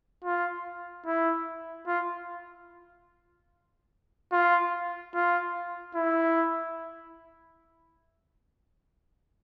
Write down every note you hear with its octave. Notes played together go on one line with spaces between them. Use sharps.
F4
E4
F4
F4
F4
E4